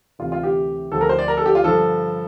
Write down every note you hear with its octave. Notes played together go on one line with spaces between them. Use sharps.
D2 C3 E3 F4
F4
G4
D2 D3 F3 A4
A#4
C5
D5
A#4
A4
G4
F4
G2 D3 F3 A4